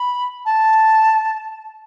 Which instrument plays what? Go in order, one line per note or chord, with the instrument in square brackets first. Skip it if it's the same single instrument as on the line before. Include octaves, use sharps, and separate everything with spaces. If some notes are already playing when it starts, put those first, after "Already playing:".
Already playing: [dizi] B5
A5